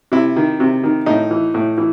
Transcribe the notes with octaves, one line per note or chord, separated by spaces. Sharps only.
C3 E4
D#3
C3
D#3
A2 D#4
E3
A2
E3